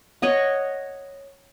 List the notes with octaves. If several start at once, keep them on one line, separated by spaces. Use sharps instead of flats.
C#5 D#5 F#5